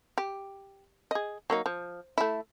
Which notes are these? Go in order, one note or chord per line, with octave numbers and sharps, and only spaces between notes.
G4
G#4 D#5
F#3 A#3 D#4
F3
A3 E4